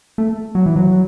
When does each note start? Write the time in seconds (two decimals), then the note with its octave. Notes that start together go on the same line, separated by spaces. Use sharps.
0.18 A3
0.55 F#3
0.66 E3
0.76 F#3